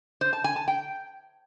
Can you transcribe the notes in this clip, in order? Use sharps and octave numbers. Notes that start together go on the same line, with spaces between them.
C5
A5
G#5
A5
G5